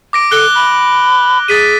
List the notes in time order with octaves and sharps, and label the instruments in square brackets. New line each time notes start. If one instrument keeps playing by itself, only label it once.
[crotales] D6 A#6 D7
[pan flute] A4 [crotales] F#6 G7
[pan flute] B5
[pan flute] G#4 [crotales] A6 B6 D#7